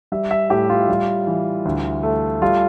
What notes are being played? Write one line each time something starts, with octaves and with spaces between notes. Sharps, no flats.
G3 E5
E5
A2 G4
F4
G3
E3
D2
A3
G3 F4